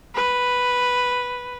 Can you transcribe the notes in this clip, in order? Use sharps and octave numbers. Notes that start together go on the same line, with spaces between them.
B4